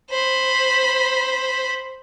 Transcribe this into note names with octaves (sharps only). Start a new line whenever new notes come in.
C5 B5